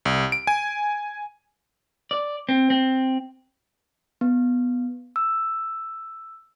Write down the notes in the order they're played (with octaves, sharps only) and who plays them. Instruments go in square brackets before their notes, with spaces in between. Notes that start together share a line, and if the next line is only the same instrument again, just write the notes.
[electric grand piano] C2
D7
G#5
[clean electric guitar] D5
C4
C4
[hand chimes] B3
E6